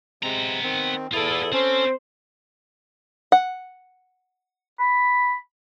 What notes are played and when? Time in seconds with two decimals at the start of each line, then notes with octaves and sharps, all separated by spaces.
0.23 C3 G#3 B3 C4 A#5
0.63 D#3 C4
1.13 E2 E4 F4 A4 D5 D#6
1.53 C4 C#4 A4 C5
3.32 F#5
4.79 B5